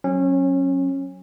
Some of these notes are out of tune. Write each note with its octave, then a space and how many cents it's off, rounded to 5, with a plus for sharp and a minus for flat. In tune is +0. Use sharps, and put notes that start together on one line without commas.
F#3 +0 C#4 -25